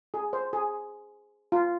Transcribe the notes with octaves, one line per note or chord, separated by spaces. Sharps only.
G#4
C5
G#4
F4